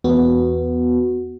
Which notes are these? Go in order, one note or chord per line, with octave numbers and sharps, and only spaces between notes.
E2 B3 F#4